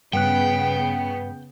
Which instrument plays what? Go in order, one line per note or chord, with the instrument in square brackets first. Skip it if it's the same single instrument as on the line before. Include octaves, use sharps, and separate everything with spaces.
[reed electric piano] G2 B4 F#6 [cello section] C#3 B3 [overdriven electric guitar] G5